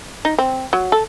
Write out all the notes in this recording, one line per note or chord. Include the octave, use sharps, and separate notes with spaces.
D#4
C4
F#3
A4